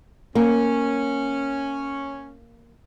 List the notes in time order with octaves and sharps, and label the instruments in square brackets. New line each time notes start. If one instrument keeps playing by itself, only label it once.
[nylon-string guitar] A#3 [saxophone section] C#4